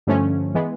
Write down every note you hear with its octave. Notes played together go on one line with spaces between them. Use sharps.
G2 D3 F3 A3 C#4
E3 G#3 B3